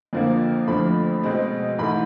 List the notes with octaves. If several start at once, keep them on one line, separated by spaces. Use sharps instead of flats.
F2 D3 F3 A#3
F2 D3 F3 A3 B5
B2 G#3 C4
G#2 E3 A3 B5